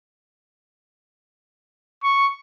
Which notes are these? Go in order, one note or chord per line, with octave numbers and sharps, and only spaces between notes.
C#6